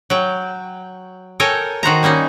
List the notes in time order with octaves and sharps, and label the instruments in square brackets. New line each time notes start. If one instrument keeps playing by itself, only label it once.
[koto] F#3 G5
A4 A#4 C#5 G5 G#5
D#3 F#4 C5 A#5
G3 A#3 C#4 D#4